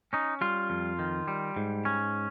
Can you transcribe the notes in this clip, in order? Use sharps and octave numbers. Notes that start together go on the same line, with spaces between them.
C#4 D#4
G3 F4
F2
D#3
G3
G#2
C#4